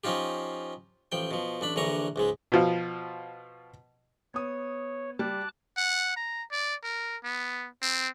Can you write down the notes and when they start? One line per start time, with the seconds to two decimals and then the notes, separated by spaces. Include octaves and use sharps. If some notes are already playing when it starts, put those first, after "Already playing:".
0.04 F3 C#4 D#4 F4 G4
1.12 A1 F3 G5
1.31 B2 F3
1.61 A1 D4 B5
1.76 A#1 D3 E3 A#5 C#6
2.16 C#2 G#2 G#3
2.52 B2 F3 F4
4.34 B3 C#5 D#6
5.19 G3 A5 D6 F#6
5.77 F#5
6.17 A#5
6.52 D5
6.84 A#4
7.24 B3
7.82 C4